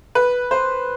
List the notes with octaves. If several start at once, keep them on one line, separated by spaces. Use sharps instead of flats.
B4
C5